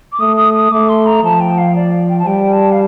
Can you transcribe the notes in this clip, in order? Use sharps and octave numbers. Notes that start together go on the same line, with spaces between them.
D6
A3 D#6
D#6
D#6
A3 D6
C6
A#5
F3 A5
G5
F5
D5
G5
A5
G3 G5
A5
F5